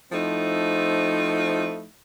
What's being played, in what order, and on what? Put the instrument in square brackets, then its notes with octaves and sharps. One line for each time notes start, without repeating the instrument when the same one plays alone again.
[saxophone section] F3 A3 C4 D#4 E4